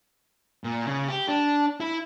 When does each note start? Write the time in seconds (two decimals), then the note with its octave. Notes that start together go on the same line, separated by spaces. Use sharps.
0.64 A#2
0.86 C#3
1.09 G4
1.28 D4
1.80 E4